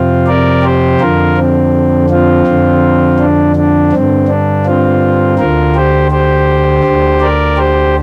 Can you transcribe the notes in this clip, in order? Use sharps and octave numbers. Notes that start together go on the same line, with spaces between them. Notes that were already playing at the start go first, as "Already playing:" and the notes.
Already playing: F2 C3 C4 F4
A#4 D5
G4 C5
F2 D3 F4 A#4
C4
C4 F4
F2 D3
D4
D4
G2 D3 C4
D4
C4 F4
D2 D3 F4 A#4
G4 C5
G4 C5
D2 D3
A#4 D5
G4 C5